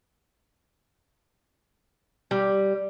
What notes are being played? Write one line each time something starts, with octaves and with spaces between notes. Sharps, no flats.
G3